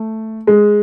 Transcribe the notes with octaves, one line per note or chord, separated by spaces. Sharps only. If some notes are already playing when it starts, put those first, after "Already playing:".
Already playing: A3
G#3